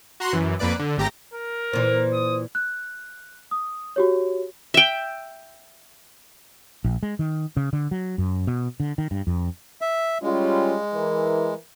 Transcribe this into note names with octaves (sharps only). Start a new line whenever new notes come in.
F#4 A#5 C6 F#6
F#2 E3
F2 A#3 B4 D5 D6
D3
G#1 A3 G4 A#5 A#6
A#4
A#2 E3 C5
D#6
F#6
D#6
F#4 G4 C#5
E5 G5
A#1
G#3
D#3
C#3
D3
F#3
F#2
B2
D3
D#3
G2
F2
E5
G3 G#3 C#4 F4
E3 A#4